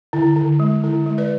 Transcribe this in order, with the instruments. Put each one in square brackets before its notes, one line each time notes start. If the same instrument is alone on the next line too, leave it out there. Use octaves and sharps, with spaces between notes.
[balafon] D3 E4
D3
G#3
D3 E4
G#3
B4 D5